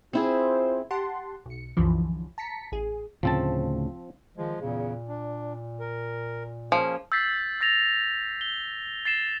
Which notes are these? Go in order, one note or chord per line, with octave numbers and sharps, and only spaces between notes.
C4 E4 F4 G#4 C5
G4 F#5 A5 C6
B1 C#7
C2 F#2 D3 E3 F3
A5 A#5 B6 C#7
A1 G#4
D2 A2 C#3 F3 C4 A5
D#3 F3 G#3
E2 A#2 C#3
D4
A#4
F3 A#3 C#4 G#4
E6 G6 A6 B6 C7
E6 A6 A#6 F7
G7
A6 C7 E7